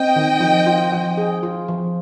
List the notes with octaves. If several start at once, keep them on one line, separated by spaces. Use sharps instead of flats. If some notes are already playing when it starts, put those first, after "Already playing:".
Already playing: C4 D#5 G5
D#3
F3
F4
F3
G#4
F4
F3